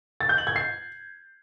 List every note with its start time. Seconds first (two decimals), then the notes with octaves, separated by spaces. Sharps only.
0.21 A6
0.29 G6
0.38 F#7
0.47 G#6
0.56 C7